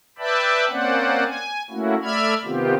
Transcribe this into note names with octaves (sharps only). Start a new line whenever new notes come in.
B4 D5 E5 G5 A5 B5
A#3 C4 C#4 C5 D5 F#5
G#5
A3 A#3 C#4 E4 F#4
A3 D5 E5 B5 F6 G#6
C3 D#3 B3 C4 F4 G4